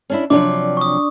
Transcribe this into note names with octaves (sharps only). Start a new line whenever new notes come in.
C#4 D4 E4
C3 F3 F#3 D4 D6
C#6 D#6